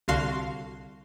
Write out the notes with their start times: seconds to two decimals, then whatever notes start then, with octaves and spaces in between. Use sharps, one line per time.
0.08 C2 D3 F#4 F5 C6